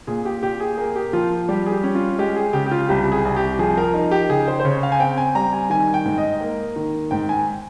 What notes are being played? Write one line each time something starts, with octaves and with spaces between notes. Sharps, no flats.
A#2 G#4
G4
A#2 G4
G#4
A#3 G#4
G4
F3 F4
G3 G4
G#4
G4
C#4
F4
G#3 G4
G#4
C#3 G4
G4
F4
C2 G4
G#4
C2
G4
F3 G#4
A#4
D#4 A#4
G4
C#3 G#4
C5
C5
C#3 C#5
F5
G#5
C4 G5
G#5
G3 A#5
G#5
D#3 G#5
G5
G#2
D#5
A#3
D#3
G#2 G5
G#5